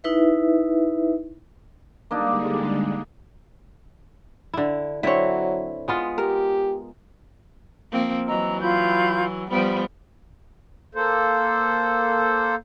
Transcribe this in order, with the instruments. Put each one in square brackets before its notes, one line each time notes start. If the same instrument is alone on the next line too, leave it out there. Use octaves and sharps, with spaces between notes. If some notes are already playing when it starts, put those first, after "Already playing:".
[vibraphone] D#4 E4 B4 E5
[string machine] D3 G3 G#3 [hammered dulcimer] A#3 D4 D#4
[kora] D3 E4
[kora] D3 C4 [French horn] F#3 [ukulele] E4 C#5
[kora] G#3 B3 F4
[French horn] G4 [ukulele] A#4
[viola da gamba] F3 A#3 C4
[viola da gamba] E3 F#3 [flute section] D#5 A#5 E6
[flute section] F4 B5 G6
[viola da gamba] F3 G3 B3 [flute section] B5
[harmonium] A#3 A4 C5